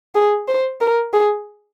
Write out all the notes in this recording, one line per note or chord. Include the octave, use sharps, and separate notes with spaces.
G#4
C5
A#4
G#4